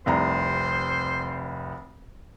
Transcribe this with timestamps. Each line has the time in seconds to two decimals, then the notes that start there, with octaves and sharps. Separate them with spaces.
0.06 F1 C2 C5 A#5